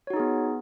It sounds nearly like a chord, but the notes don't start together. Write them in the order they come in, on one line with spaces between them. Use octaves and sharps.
C#5 F#4 D#4 G#4 B3